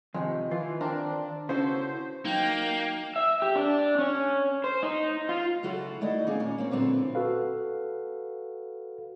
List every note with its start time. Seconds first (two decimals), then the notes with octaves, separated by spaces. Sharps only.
0.14 F2 C3 D#3 G#3
0.51 E3 F4
0.81 C4 D4 A#4
1.49 C#3 B3 C#4 E4 F#4 A4 C5
2.25 F#3 A#3 D#4 G5
3.16 E5
3.42 G4
3.56 D4
3.99 C#4
4.64 C5
4.83 D#4
5.29 F4
5.63 C#3 F#3 E4 F#4 A4
6.01 D#3 A3 E4 D5 D#5
6.27 D2 A#3 C#4 D#4 G#4
6.40 A#2 C#4
6.58 A#3 C4 C#4
6.71 A#2 D3 F#3 B3 C4 E4
7.15 F#4 A4 B4 F5